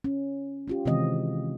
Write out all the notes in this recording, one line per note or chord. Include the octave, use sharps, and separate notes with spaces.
C#4
C#4 F4 G4
C3 D#3 E3 G#3 C4 D#5